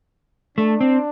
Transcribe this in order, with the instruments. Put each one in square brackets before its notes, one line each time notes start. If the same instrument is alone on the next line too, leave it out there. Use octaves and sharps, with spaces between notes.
[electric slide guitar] A3 [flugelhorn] D4
[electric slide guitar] C4